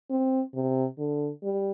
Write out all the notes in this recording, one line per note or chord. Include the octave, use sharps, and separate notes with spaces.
C4
C3
D3
G3